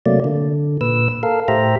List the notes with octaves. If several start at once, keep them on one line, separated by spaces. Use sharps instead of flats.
C3 F#3 A3 A#3 D5
D3
A#2 B4 E6
A4 A#4 F5
A2 G4 C5 E5 A#5